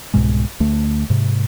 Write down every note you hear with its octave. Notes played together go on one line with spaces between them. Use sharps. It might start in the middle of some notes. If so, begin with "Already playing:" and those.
C2 G#2 B2 G#3
D2 A3
G#2 C3